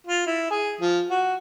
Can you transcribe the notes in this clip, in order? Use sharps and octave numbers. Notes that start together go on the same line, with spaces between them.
F4
E4
G#4
F3
F#4